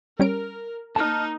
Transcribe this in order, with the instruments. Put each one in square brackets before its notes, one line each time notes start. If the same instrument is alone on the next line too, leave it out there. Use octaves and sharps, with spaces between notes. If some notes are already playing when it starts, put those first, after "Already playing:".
[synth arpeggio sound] G3 C#4 D7 [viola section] A#4
[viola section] A#3 D#4 [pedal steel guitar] A5 F6